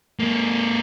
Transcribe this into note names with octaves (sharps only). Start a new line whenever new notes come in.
G#3 A#3